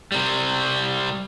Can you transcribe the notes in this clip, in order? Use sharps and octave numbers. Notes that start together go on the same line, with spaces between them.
C3 G3